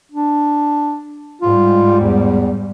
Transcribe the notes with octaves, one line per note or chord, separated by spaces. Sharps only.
D4
G#2 G3 F4
E2